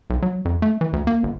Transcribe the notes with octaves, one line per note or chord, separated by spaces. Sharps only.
B1
F#3
F2
A3
E3
D2
A#3
G1